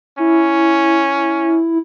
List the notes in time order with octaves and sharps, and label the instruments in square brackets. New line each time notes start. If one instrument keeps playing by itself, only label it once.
[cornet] C#4 [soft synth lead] E4